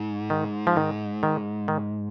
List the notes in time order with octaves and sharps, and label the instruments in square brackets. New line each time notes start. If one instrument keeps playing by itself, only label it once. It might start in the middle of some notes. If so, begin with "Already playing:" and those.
Already playing: [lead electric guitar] G#2
[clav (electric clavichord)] D#3
F3
D#3
D#3
D#3